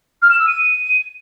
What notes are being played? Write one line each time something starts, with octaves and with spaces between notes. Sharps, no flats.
F6
E7
E6
D#7